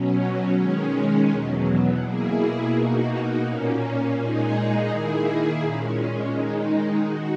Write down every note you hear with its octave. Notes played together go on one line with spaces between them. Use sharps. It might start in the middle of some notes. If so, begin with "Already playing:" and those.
Already playing: B2 F#3 C#4
D#3 G#3 C#4
E2 B2 F#3
B2 A#3 E4 G#4
B2 A#3 D#4 F#4
A#2 A#3 C#4
A#2 G#3 D#4 G#4
D#3 A#3 E4 G#4
A#2 G#3 C#4
D#3 G#3 D#4
F#4